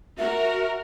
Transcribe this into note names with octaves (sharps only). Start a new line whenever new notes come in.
F#4 A#4 E5